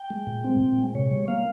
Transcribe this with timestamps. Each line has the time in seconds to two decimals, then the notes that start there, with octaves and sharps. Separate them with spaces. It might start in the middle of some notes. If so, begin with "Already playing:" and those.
Already playing: G5
0.10 G#3
0.27 A#2
0.44 C4
0.60 A#2
0.78 G#3
0.95 C3 C#5
1.11 G3
1.28 A#3 F5